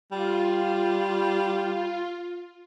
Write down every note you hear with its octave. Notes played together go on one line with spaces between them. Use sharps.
G3 F4